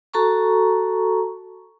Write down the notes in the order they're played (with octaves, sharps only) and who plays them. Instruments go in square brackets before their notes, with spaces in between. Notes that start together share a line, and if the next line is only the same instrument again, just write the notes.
[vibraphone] F#4 A4 A5 A#5 C#6